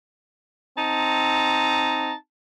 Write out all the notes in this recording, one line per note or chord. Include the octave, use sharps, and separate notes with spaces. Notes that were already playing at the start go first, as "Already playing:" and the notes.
C4 D#4 A5 A#5